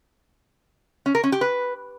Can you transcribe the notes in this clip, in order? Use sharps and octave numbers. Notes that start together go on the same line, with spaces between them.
C#4
A#4
C#4
G4
B4